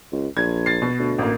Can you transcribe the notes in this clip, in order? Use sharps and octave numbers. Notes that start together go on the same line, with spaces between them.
C#2
A#1 G#6
A6 C7
B2
D2
A1 A#3